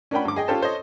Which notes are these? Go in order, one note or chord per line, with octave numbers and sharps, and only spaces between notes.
C#4 D4 A#4 F#5 G5 B5
G2 D6
G#4 D#5 G5
C#4 F4 G4 A4 C5 A5
A4 C5 C#5 D#5